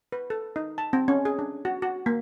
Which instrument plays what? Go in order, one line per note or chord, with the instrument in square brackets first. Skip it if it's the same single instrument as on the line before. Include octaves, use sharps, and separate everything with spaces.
[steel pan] B4
A4
D#4
A5
C4
C#4
G#4
D4
F#4
F#4
A#3